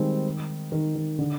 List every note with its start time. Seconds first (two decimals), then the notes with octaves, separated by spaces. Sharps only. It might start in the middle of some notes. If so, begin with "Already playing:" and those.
Already playing: D#3 G3 G#3 C4
0.72 D#3
0.95 D#3
1.19 D3